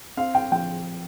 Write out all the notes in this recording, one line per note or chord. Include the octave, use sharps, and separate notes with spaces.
C4 F5
G5
F3 G5